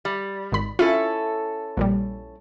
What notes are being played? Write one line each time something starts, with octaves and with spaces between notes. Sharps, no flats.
G3
G#1 B5
C#4 E4 F4 A4
A#1 A#2 G3